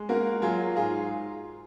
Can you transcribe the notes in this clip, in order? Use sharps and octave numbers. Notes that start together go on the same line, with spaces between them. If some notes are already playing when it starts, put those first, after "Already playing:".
Already playing: G#3
A#3 F#4 A#4
F#3 F4 G#4
G#2 F4 G#4